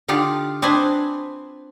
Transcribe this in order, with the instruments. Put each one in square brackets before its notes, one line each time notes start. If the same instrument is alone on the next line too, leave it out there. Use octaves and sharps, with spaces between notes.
[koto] D3 D#4 F4 G4 D5
C4 D4 B4 C5 D#5 G#5